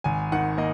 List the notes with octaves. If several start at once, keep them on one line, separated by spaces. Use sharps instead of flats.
G#1 G#5
D#3 F#5
A#3 D#5